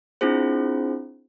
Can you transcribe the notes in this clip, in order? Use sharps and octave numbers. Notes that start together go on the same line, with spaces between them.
C4 D4 E4 F4 G#4 C5